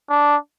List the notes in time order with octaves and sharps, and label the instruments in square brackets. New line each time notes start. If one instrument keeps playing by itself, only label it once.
[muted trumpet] D4